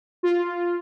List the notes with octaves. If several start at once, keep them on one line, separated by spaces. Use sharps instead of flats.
F4